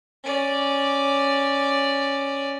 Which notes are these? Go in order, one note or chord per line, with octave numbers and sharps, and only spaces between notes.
C#4 D5